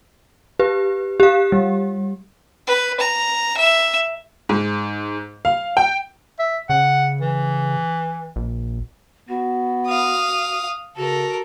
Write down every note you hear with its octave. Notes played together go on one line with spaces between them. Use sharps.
G4 B4
G4 F5
G3
B4
A#5
E5
G#2
F5
G5
E5
C#3 F#5
E3
A#1
B3 F#4
F5 D#6
C#3 F#4 A4 A#4